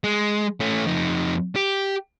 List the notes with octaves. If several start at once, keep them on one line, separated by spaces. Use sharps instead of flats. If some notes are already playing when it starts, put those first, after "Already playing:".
G#3
A3 C#4
F2 D#4
G4